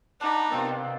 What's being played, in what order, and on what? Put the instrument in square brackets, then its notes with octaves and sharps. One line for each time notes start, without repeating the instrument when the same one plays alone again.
[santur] D4 D5 [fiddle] D#4 [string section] F#5 B5
[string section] C3 D#3 B3 [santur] C4 F4